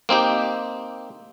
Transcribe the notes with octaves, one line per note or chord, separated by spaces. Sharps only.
A#3 C4 D#4 G4